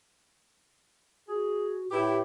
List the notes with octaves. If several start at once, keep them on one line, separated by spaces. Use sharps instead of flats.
F#4 G#4
A2 E4 G4 B4